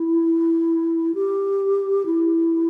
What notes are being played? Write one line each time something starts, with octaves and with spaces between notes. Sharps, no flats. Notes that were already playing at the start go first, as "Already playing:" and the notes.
Already playing: E4
G4
E4